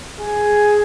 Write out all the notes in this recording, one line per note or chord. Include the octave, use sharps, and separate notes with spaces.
G#4